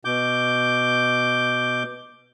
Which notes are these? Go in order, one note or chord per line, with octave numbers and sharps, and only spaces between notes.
B2 D6 G6